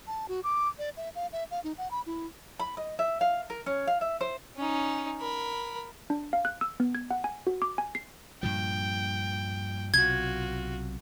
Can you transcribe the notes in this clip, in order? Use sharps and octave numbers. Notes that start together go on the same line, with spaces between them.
A5
F#4
D6
D5
E5
F5
E5
F5
D#4
F#5
B5
E4
B5
D#5
E5
F5
A#4
C#4
F5
E5
C5
C#4 D#4
A#4 B5
D4
F5
F#6
E6
B3
G#6
F#5
G#5
F#4
D6
G#5
C7
G2 A#2 F3 G5
B1 C3 F4 F#4 G#6